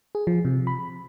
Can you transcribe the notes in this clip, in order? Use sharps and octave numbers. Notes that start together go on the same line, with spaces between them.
G#4
F3
C3
B5